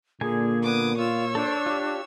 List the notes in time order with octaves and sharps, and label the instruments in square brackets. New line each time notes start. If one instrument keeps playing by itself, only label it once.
[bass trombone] A#2 [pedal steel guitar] D3 A#3 G#5 [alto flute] G#4
[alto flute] B3 [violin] D6 D#6
[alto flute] F4 [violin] C#5 E6
[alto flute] D4 [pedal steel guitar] A4 C5 D5
[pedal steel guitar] F4 G4